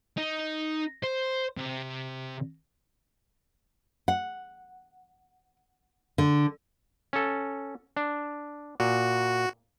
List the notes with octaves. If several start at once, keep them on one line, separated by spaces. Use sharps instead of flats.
D#4
C5
C3
F#5
D3
C#4 A4
D4
A#2 F#4